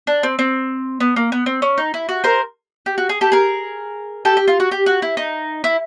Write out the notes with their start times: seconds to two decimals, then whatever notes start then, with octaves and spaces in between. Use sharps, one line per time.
0.07 D4
0.23 C4
0.39 C4
1.00 B3
1.16 A#3
1.32 B3
1.46 C4
1.62 C#4
1.78 D#4
1.94 E4
2.09 F#4
2.24 A#4 C5
2.86 G4
2.98 F#4
3.09 G#4
3.21 G4 A4
3.32 G#4 A#4
4.25 G4 A4
4.37 G4
4.48 F4
4.60 F#4
4.72 G4
4.86 F#4
5.02 E4
5.17 D#4
5.64 E4